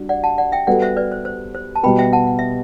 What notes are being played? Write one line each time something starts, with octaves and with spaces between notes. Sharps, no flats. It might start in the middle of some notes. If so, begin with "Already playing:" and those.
Already playing: G3 D4 F#4
D5 F#5
F#5 A5
D5 F#5
E5 G5
G3 B3 F#4 A4 D5 F#5
C5 E5
B4 D5
C5
C5
C5
A5
B2 G3 B3 G5 B5
E5 G5
F#5 A5
F#5
E5